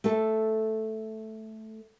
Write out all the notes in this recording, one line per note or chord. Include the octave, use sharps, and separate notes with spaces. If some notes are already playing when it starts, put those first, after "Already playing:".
A3 A4